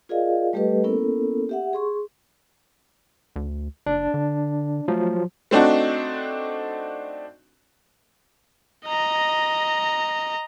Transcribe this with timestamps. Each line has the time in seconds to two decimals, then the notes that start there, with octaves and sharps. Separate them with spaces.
0.09 F4 G#4 A#4 D5 D#5 F5
0.53 G3 A3 G4 A4 B4 D#5
0.84 A#3 B3 C#4 E4 A4 A#4
1.49 G4 E5 F#5
1.73 G#4 C6 C#6
3.36 D2
3.86 F#1 D4
4.14 D3
4.88 F3 F#3 A3
5.51 A3 C4 D4 D#4 F#4
8.86 D#5 A#5